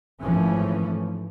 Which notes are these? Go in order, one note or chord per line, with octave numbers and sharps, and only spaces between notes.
G#1 E3 F3 A3 C#4